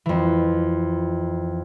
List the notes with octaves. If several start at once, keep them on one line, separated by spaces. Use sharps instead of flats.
F2 E3